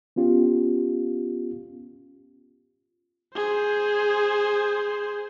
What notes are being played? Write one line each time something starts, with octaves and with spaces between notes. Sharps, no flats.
B3 C#4 F4 G4
G#4 C5